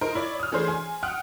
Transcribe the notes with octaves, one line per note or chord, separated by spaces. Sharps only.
D#4 A#4 C5
E4 C#5 D5
D#6 F6
E3 A3 C#4 D4 G#4 C5
G#5 C6
F#5 G5 D#6 F6 F#6